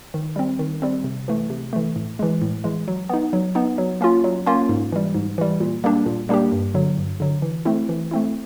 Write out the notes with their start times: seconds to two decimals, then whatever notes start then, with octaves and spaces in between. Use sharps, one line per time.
0.14 D#3
0.36 G3 C4
0.59 D#3
0.82 G3 C4
1.04 C3
1.28 E3 A3
1.50 C3
1.73 E3 A3
1.96 A2
2.19 E3 G#3
2.42 A2
2.64 E3 G#3
2.88 F#3
3.09 B3 D#4
3.33 F#3
3.55 B3 D#4
3.78 F#3
4.01 A#3 C#4 F4
4.24 F#3
4.46 A#3 C#4 F4
4.69 G#2
4.92 E3 G3
5.15 G#2
5.38 E3 G3
5.60 A#2
5.84 G3 A#3 D4 G4
6.06 A#2
6.29 G3 A#3 D4 G4
6.52 G2
6.74 D3 F#3
6.98 G2
7.20 D3 F#3
7.42 E3
7.65 A3 C4 E4
7.89 E3
8.11 A3 C4 E4